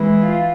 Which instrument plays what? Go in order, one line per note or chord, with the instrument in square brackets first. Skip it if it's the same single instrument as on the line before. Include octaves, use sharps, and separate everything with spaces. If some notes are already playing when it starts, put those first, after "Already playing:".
Already playing: [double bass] E3 [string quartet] G#3
[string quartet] F4